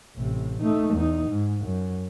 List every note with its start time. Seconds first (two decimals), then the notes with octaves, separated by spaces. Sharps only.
0.17 A1 C3
0.60 A3 D#4
0.94 E2 D#4
1.29 G#2
1.65 F#2